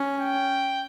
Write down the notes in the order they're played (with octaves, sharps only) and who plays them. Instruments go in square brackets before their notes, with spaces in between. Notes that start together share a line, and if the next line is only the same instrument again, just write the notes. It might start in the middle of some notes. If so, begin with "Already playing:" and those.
Already playing: [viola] C#4
[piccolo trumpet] G5